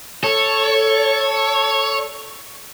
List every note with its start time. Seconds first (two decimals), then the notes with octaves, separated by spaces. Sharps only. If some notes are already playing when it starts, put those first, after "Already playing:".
0.24 A4 C#5